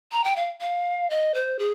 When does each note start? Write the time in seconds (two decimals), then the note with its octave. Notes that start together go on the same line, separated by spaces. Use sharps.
0.12 A#5
0.24 G5
0.36 F5
0.61 F5
1.10 D#5
1.34 C5
1.59 G#4